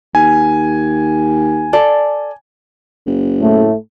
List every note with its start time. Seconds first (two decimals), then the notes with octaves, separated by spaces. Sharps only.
0.15 D#2 G#5
1.73 A4 D5
3.06 F#1
3.40 A2 A3